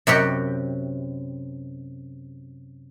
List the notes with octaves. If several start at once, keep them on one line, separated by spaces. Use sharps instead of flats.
F#2 C3 F#4 G4